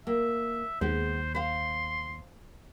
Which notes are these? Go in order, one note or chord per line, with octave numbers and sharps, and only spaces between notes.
A#3 E5
D#2 G#3 B3 C5
C5 F5 C6